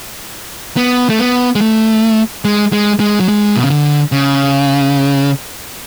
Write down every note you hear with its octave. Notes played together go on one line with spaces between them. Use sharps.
B3
A3
B3
G#3
A3
G#3
G#3
G#3
F#3
G#3
B2
C#3
D3
C#3